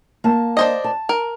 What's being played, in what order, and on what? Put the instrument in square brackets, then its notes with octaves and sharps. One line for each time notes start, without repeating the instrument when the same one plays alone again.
[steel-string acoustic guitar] A#3 A5
[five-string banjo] D4 C5 D#5
[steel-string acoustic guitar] A5
[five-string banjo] A#4